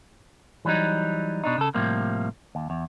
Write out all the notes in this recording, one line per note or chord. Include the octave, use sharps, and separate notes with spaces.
E3 F#3 G3 D4 D#4
B2 D4 D#4
C#3 A4
A2 C3 F3 G3 A#3
D#2
E2